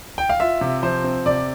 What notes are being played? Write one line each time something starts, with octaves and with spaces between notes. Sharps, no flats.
G5
F5
F4 E5
C3
F3 C5
C4
C3 D5